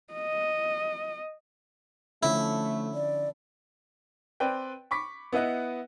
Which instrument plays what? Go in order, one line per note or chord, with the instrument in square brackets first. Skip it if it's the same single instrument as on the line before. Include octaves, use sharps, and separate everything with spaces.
[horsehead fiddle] D#5
[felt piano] D3 F3 C#4 [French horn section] A3 [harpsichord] E4
[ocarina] D5
[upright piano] C4 B4 D5 G5
B5 C#6 D6 B6
B3 E4 B4 D#5 F#5